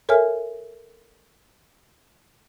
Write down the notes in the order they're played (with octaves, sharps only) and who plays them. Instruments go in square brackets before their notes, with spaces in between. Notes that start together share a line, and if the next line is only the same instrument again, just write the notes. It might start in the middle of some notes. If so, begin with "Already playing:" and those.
[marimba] A4 A#4 C#5 E5 G#5 F6